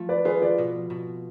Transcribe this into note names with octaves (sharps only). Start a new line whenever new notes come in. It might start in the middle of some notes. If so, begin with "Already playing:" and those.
Already playing: F3 A3
B4 D5
F4 G#4 B4
B4 D5
B2
B2